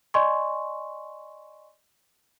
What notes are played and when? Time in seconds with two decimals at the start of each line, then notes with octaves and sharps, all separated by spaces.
0.14 D5 D#5 G#5 C6 C#6